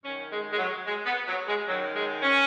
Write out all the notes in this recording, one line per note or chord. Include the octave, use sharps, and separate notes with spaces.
F#2 D#3 C#4
G#3
G#3
F#3
G#3
B3
F#3
G#3
F#2 D#3 F#3
G#3
C#4